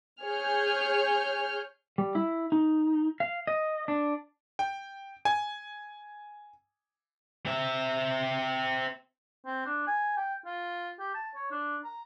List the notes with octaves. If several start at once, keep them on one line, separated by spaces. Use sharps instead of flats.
G#4 C#5 F6 G6
G3
E4
D#4
F5
D#5
D4
G5
G#5
C4 E5
C4
D4
G#5
G5
F4
G4
A5
C#5
D4
A#5